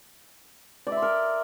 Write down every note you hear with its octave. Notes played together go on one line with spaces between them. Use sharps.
D5
E5
C6
A#4